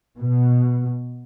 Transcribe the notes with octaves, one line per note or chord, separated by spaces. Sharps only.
B2